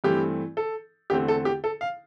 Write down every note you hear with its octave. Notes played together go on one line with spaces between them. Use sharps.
G2 E3 A3 C4 G4
A4
E2 D3 A3 C4 G4
A4
G4
A4
F5